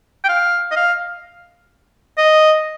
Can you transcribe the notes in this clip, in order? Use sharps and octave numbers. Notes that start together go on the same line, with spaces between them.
G5
F5
D#5
F5
D#5